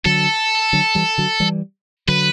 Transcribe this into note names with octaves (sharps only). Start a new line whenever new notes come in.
D3 F#3 A4
D3 F#3
E3 G3
D3 F#3
E3 G3
D3 F#3 B4